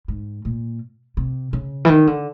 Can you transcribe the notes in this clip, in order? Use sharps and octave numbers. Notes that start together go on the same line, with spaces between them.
G#2
A#2
C3
C#3
E3
D#3
D3